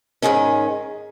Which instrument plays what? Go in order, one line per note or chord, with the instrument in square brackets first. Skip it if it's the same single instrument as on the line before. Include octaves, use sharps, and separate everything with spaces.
[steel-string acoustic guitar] G#2 D#3 G#3 C#4